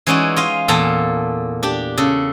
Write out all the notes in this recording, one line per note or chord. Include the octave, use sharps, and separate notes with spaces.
E3 G#3 C#4 D#4 F#4 D5
F4 D#5 F5
E2 A#2 A4 F5 A5 A#5
D4 G4
C#3 A4